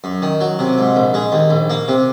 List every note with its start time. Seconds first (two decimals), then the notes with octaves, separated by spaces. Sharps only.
0.04 F#2
0.22 D#3
0.41 F#3
0.59 C3
0.78 G#2
0.96 A#1
1.14 G#3
1.32 D#2
1.50 A#1
1.70 A#3
1.88 C3